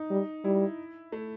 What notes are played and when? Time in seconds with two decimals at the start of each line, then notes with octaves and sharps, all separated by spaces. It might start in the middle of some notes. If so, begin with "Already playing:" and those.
Already playing: D#4
0.11 G3
0.44 G3 E4
1.12 A3